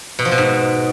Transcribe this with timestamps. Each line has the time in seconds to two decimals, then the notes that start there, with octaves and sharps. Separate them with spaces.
0.19 B2
0.25 F3
0.32 B2
0.38 G#2